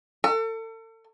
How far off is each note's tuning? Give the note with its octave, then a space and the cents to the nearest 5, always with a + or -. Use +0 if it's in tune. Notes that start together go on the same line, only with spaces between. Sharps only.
A4 +35